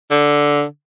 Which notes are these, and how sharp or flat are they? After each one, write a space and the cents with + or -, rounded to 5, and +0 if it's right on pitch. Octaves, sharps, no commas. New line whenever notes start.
D3 -5